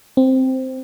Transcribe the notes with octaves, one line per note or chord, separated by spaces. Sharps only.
C4